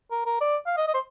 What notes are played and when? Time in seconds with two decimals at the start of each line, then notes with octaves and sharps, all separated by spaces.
0.11 A#4
0.26 A#4
0.41 D5
0.66 F5
0.77 D#5
0.88 D#5
0.94 C5